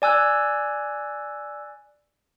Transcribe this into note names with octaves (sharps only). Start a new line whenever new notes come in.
D5 G#5 E6 F#6